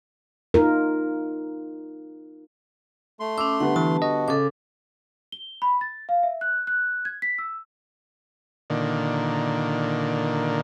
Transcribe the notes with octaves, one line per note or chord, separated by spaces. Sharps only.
D#4 F4 A#4
A3 C6
C#4 D6 E6
D3 G3 B3 F#5
E3 A5
F#4 D#5
C#3 A4 D6
G7
B5
A6
F5
E5
F#6
F#6
G#6
B6
E6
A#2 D3 D#3